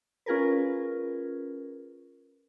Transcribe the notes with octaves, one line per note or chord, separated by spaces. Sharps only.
C#4 F4 G#4 A#4 B4